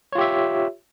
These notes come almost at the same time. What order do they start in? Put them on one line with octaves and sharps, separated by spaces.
C#5 F4 G4 E5